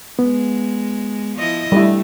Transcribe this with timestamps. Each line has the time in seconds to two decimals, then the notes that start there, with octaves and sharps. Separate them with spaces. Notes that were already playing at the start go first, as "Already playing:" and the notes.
0.19 G#3 B3
1.38 F3 E4 D#5
1.72 G3 A3 E4